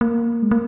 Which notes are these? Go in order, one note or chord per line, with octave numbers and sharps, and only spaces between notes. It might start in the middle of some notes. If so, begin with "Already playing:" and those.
A#3
G#3
A#3